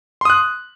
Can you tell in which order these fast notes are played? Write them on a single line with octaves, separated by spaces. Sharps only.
C6 D#6 F#6